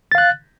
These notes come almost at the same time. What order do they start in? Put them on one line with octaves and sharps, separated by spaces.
A6 F5 F#6